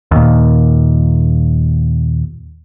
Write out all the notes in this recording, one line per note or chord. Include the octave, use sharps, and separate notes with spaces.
D#2 A#2